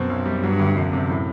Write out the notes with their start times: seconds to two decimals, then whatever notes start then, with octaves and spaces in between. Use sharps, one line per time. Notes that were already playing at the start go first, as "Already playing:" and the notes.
Already playing: F#2 B2 C4
0.10 B1
0.26 G3
0.43 G2 F#3
0.59 D2
0.76 E1 F#2
0.93 C3
1.10 A2